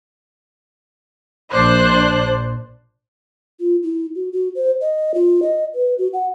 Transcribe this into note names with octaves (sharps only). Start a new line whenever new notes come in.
A#1 D4 C5 F#6
F4
E4
F#4
F#4
C5
D#5
F4
D#5
B4
F#4
F#5